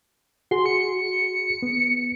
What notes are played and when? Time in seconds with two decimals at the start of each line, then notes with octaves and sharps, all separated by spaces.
0.51 F#4 G#4 C6
0.66 C#7
1.63 B3